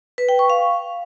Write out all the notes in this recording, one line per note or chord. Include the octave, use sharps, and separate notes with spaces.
B4
G5
C#6
F5